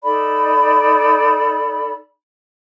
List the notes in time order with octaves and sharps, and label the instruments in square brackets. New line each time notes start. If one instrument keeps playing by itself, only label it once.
[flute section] D#4 A4 D5 B5